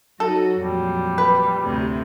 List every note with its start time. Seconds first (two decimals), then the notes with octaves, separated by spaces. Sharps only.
0.20 F#3 D#4 F#4 A4
0.60 F2 A#2 G3
1.18 B4
1.62 D2 A2 C3